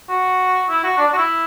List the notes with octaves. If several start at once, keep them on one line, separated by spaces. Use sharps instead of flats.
F#4
E4
F#4
D4
D4
F#4
E4